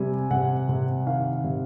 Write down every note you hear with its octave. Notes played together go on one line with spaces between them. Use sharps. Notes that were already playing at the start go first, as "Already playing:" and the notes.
Already playing: C3 G3 G#5
C3 F#5
C3
D#3 F5
C3